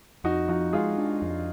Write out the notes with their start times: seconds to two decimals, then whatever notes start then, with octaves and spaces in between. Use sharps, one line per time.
0.24 F2 D#4 F#4
0.48 F3 D#4 F#4
0.73 G#3 F4 G#4
0.98 D4
1.22 F2